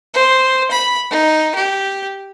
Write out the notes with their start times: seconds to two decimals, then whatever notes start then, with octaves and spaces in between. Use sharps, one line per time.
0.14 C5
0.71 B5
1.11 D#4
1.55 G4